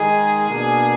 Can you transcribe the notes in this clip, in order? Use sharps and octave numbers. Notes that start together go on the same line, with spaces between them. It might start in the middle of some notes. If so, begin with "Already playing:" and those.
Already playing: D#3 G#3 D#4 G#4
B2 A#3 D4